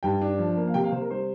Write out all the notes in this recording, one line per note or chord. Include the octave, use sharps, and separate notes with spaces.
G2 G5
D4
F3
A#3
F5
C3 G5
F5
C3 C5
A#4
G3 C5